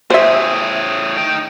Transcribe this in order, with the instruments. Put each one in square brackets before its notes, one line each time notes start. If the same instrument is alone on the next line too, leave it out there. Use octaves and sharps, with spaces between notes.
[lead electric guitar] A2 G#4 [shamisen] C5 E5
[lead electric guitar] D#4 G5